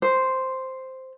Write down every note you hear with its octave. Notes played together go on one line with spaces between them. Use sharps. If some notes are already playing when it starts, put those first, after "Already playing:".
C5